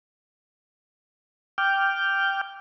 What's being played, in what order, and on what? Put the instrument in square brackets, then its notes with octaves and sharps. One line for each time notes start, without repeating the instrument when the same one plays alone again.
[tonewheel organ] G5 D6 F6 G6